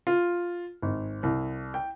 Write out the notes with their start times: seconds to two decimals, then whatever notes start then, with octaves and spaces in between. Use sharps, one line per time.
0.07 F4
0.82 G#1
1.23 C2
1.74 G5